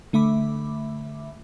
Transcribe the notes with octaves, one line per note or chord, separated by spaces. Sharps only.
D3 A3 E5 B5 D6